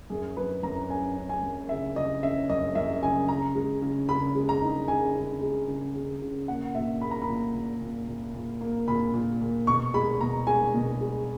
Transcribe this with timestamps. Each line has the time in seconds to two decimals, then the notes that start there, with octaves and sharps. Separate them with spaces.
0.10 F#2 G#4
0.37 F#3 B4
0.63 F#2 A#5
0.90 C#4 G#5
1.16 C#4
1.29 G#5
1.42 F#2
1.69 C#3 E5
1.96 C#3 D#5
2.23 C#4 E5
2.49 F#2 D#5
2.75 F#2 E5
3.02 C#3 G#5
3.28 C#3 A#5
3.55 G#3
3.82 C#3
4.08 C#3 B5
4.35 G#3
4.49 A#5
4.62 D#4
4.88 C#3 G#5
5.15 C#3
5.41 G#3
5.68 C#3
5.95 C#3
6.22 C#3
6.48 A#3 F#5
6.75 A#2 E5
7.01 A#3 B5
7.11 A#5
7.22 B5
7.28 A#2
7.55 A#2
7.81 A#2
8.08 A#2
8.34 A#2
8.61 A#3
8.88 A#2 B5
9.14 A#2
9.41 A#2
9.67 B2 C#6
9.94 G#3 B5
10.21 B2 A#5
10.47 G#3 G#5
10.74 B2
11.01 G#3